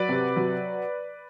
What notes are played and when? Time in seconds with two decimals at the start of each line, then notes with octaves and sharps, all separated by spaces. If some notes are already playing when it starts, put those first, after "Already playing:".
Already playing: F#3 B4 D5
0.09 C3
0.36 F#3